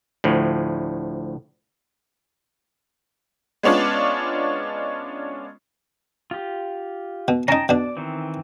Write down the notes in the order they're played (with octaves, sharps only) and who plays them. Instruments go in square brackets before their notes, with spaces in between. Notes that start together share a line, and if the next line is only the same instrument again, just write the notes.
[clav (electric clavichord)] D2 A2 F3
[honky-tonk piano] G#3 B3 C#4 D4 F4
[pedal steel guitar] F4 G4
[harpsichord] B2
[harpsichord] C#4 D#4 [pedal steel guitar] G5 A5 A#5
[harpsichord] B2 D4 [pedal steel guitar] D5
[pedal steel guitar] D#3 E3 C4